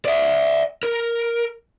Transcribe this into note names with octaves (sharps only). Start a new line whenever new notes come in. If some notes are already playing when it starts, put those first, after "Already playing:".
D5 E5
A#4